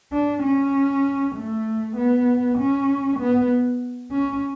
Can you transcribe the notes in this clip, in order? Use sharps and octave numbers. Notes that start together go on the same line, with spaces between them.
D4
C#4
A3
B3
C#4
B3
C#4